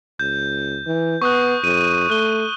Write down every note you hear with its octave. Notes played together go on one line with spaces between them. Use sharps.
C#2 G6
E3
B3 C#6 D#6 F#6
F2 D#7
A3 F#6 G7